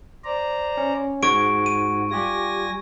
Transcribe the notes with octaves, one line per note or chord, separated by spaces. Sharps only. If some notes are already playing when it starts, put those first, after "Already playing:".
C5 D5 A#5
C#4
G#2 F#4 G#4 C#6 G#6 D7
D#7
G3 F4 G4 G#5 A#6